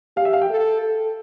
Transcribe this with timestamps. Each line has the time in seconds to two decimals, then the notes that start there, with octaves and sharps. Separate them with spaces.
0.16 G4 F5
0.25 E5
0.33 F5
0.41 G5
0.50 A4
0.83 A4